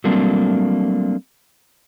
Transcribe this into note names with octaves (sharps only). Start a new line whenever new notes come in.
F#3 G3 A3 A#3 C4 D4